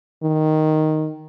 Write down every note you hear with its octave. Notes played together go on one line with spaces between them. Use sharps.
D#3